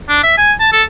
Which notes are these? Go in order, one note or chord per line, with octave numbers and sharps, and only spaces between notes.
D4
E5
G#5
A5
A4